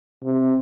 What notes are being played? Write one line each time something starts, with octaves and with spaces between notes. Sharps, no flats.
C3